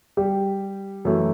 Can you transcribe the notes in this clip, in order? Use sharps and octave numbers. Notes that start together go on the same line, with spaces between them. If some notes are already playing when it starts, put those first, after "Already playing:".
G3 G4
F#2 E3 A3